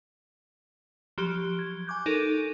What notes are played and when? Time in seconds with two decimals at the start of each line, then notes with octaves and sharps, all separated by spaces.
1.18 F3 F#3 G4
1.59 G#6
1.87 G#5 C#6 D6 F#6 G6
2.06 D#4 A4 A#4 D7 D#7